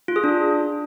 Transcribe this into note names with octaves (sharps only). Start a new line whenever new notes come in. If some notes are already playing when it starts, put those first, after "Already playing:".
F4
G#4
D4